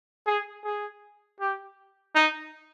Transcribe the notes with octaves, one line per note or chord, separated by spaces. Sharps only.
G#4
G#4
G4
D#4